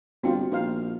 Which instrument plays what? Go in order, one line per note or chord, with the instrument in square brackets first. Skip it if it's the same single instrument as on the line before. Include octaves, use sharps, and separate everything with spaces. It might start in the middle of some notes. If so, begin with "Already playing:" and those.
[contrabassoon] G1 [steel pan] C4 F4 C5 [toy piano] F#4 G5
[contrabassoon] A#1 [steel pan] D#4 C5 F5